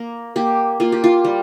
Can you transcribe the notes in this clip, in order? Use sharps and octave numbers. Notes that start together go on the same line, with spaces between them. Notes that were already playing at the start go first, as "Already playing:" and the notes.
Already playing: A#3 A#4
A#3 G4
A#3 F4
G4
F4
G3